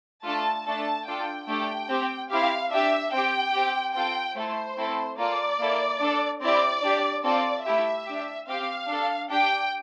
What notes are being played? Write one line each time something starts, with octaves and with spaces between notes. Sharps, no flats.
A3 D4 F4 A4 A5
A3 D4 A4 A5
D4 F4 A4 G5
A3 D4 G4 G5
C4 G4
C4 E4 G4 F5
D4 G4 E5
C4 G4 G5
C4 G4
C4 F4 A4 G5
A3 E4 A4 C5
A3 C4 E4 A4
A#3 F4 A4 D5
A#3 E4 A4
D4 A4
C4 E4 G4 D5
D4 G4
C4 F4 A4 D5
A3 E4 G4 E5
D4 G4
C4 G4 F5
D4 A4
D4 G4 G5